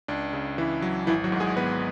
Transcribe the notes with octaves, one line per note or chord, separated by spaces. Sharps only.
C#2 D4
C#3
C#2 E3 E4
F#3
G#1 E3 E4
F#3 F#4
G#2
G#3 G#4
G#1 B3 B4